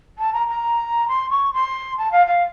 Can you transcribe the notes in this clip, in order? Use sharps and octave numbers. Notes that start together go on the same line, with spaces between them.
A5
A#5
A#5
C6
C#6
C6
A5
F5
F5